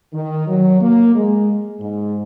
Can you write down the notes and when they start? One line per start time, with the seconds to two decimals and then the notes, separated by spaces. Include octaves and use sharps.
0.14 D#3
0.48 F#3
0.81 A#3
1.14 G#3
1.80 G#2